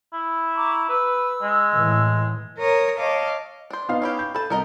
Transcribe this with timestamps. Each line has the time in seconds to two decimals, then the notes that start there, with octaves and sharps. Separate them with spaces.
0.13 E4
0.55 A#5 C#6 D6
0.89 B4 E6
1.42 G#3
1.74 A2 E3
2.59 A#4 C#5 D#6
2.98 C#5 D#5 F5 A5 D6
3.70 D4 C5
3.89 B3 D#4 F5
4.02 C#4 E4 G4
4.19 G6
4.34 A4 B4 A5
4.50 C2 B3 A#4 D#5